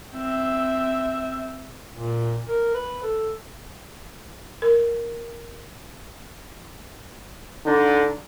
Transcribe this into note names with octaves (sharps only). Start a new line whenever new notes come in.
C4 E5
A#2
A#4
B4
A4
A#4
D3 D4 D#4